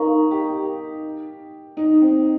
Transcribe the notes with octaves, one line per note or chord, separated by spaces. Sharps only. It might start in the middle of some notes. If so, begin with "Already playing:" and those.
Already playing: D#4 A#4 F5 A#5 C#6
G4
D#4
C4